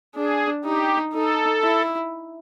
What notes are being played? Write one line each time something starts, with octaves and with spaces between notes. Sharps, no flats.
D4 G#4
D#4 G4
D#4 A4
E4